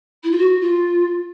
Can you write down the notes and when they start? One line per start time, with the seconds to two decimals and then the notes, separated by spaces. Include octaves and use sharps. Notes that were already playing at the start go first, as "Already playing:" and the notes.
0.23 E4
0.31 F4
0.38 F#4
0.61 F4